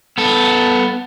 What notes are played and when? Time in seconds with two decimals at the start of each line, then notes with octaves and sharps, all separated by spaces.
0.18 B3 A4